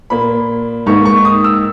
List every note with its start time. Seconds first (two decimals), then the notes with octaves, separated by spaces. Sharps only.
0.10 A#2 A#3 B5
0.86 G#2 D#3 A#3 C#6
1.06 C#6
1.25 D#6
1.44 E6